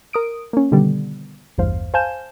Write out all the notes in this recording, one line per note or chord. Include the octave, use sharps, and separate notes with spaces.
A#4 D#6 D7
A#3 C#4
B2 D3 D#3 G3 B3
A1 E2 G2 C5 F5
C5 F5 G#5 A5 G6 E7